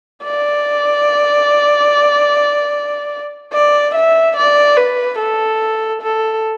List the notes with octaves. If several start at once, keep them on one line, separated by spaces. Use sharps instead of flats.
D5
D5
E5
D5
B4
A4
A4